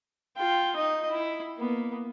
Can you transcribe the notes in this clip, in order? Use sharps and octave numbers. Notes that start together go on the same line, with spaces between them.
F4 G5
D#4 D#5
E4
A#3 B3